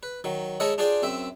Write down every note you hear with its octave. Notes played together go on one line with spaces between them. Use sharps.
B4
D#3 F#3
G#3 E4 A4 A#4 C#5 D#5
D4 F4 G#4 C5 D5 G5
F#2 C4 E5